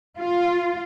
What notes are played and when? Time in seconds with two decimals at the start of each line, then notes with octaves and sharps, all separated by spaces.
0.18 F4